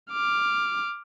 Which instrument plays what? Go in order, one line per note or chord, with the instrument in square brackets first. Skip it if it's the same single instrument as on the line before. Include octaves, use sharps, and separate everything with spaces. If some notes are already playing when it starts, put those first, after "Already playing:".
[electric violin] D6 F6